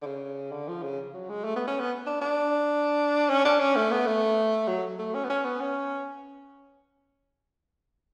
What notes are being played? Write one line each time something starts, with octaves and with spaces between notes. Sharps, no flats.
D3
C#3
D3
F3
C#3
F#3
G#3
A3
B3
C#4
B3
D4
D4
C#4
D4
C#4
A3
B3
A3
F#3
A3
C#4
B3
C#4
B3
C#4